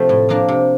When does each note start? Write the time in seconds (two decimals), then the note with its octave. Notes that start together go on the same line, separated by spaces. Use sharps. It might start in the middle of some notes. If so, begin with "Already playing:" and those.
Already playing: C3 F3 A3 C4 F4
0.09 A2
0.29 F3 A#3 D4
0.48 C3